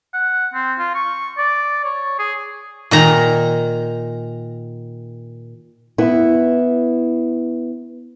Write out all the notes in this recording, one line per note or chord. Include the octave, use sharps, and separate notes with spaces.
F#5
C4
F4
C#6
D5
C#5
G#4
A#2 D#3 A#5
B3 E4